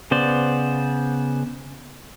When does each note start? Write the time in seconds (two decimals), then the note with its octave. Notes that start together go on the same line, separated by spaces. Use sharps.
0.11 C#3 B3 C5 D5